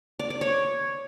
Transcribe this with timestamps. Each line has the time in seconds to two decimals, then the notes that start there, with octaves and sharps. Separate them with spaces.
0.19 D5
0.30 D5
0.41 C#5